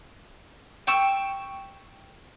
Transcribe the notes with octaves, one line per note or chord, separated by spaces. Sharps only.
G5 C#6 E6